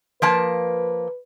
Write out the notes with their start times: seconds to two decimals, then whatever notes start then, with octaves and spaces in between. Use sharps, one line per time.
0.22 F3 A#3 B4 A5